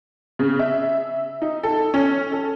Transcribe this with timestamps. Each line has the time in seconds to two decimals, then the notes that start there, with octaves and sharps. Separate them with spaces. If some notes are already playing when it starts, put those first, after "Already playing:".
0.39 C#3
0.59 E5
1.42 D#4
1.63 A4
1.94 C#4
2.32 A4